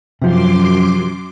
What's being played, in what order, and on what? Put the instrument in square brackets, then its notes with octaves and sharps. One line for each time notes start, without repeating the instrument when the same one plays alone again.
[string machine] F#2 C6 D6 [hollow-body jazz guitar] C3 F3 F4